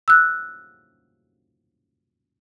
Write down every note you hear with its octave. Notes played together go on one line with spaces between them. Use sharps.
E6 F#6